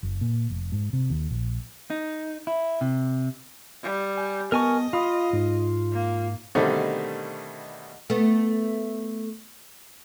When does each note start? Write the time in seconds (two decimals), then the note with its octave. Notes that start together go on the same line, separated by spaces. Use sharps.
0.03 F#1
0.21 A#2
0.50 F1
0.72 G#2
0.93 C3
1.10 D#2
1.31 A#1
1.90 D#4
2.47 E4
2.81 C3
3.83 G3
4.18 G#5
4.52 B3 A#4 D#5 G#5 A5 C#6
4.93 F4 F5 B5 D#6
5.33 G#2
5.92 A#3
6.55 B2 D3 D#3 G3 A3 C4
8.10 A3 B3